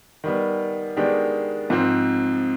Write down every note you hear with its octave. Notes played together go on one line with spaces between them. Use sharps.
D#3 G3 B3
D#3 G#3 B3 D4 G4
G#2 F3 C4